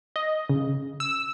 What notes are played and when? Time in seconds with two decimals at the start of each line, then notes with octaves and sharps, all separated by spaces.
0.16 D#5
0.50 C#3
1.00 E6